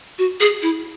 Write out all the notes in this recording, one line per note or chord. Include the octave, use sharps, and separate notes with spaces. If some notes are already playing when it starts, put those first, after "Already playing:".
F#4
G#4
E4